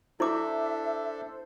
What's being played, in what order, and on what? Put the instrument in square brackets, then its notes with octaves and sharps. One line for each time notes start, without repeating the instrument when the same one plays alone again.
[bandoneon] D4 A4 [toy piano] E4 D6 [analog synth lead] C5 [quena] E5